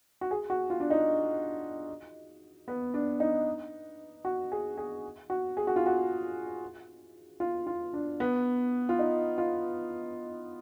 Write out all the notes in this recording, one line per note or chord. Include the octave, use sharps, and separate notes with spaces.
F#4
G#4
F#4
F4
D4
D#4
B3
D4
D#4
F#4
G#4
G#4
F#4
G#4
F#4
F4
F#4
F4
F4
D4
B3
F4
D#4
F4